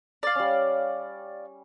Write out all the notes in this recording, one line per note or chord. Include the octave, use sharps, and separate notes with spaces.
D5 F5
G3 C#4